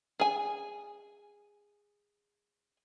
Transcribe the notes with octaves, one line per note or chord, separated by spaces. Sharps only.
G#4 G#5